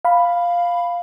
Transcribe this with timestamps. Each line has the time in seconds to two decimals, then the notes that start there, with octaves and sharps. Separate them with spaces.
0.05 F5 B5